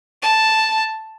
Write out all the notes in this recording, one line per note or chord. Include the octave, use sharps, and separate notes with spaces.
A5